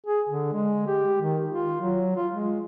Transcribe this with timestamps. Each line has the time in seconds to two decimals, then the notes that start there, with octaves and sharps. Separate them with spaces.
0.07 G#4
0.29 D3
0.53 G#3
0.87 G4
1.22 D#3
1.49 F4
1.81 F#3
2.16 F4
2.33 G#3